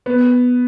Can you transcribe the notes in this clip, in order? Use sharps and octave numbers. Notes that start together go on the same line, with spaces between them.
B3